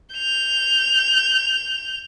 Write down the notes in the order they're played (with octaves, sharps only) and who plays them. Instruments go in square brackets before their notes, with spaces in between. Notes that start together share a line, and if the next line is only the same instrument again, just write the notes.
[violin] G6 F7